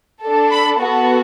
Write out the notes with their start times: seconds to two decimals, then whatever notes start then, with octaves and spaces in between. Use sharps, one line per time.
0.23 D4 A4
0.51 B5
0.79 B3 F#4 A4